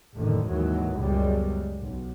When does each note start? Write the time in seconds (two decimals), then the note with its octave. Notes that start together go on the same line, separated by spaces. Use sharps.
0.16 F#1 F2 A2 D3 D#3
0.47 D#2 G#2 D#3 E3 F#3
0.96 C#2 F#2 B2 G3 G#3
1.80 B1